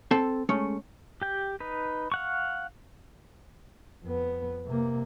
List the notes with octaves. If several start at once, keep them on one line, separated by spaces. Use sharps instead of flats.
C4 A4 A5
G#3 A3 C#4
G4 G5
D#4 B4
F5 F#5 C#6
F2 B3
C3 A#3